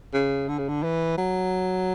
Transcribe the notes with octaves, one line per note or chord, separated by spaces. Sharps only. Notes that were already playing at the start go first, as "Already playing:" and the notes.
C#3
D3
C#3
D3
E3
F#3